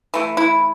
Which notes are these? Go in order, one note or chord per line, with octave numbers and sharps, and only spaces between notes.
E3 A3
E4